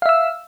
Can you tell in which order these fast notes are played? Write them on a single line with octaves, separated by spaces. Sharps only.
F5 E5 E6